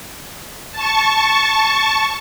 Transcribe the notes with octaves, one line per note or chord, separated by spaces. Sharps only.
A5 C#6